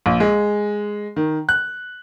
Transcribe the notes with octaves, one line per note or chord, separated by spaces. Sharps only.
A#1
G#3
D#3
F#6